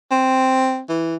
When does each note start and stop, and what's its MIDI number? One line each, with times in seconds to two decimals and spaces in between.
0.11 0.83 60
0.89 1.16 52